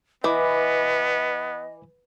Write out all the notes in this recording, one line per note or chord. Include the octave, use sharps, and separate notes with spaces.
E3 B3 B4 D#5 D6